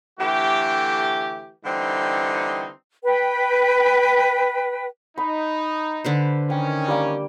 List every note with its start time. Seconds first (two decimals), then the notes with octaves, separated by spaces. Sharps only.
0.19 D3 E3 A3 G4
1.65 D3 E3 G3 C4 D#4
3.03 B4 G5
5.18 D#4 B5
6.04 D3 B4 C5
6.50 D#3 C#4 G5
6.88 G3 A#3 G5